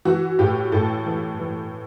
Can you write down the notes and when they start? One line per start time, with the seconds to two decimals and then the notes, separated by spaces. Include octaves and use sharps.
0.05 E3 F#4
0.39 A2 G4
0.72 A2 A4
1.06 E3
1.39 E3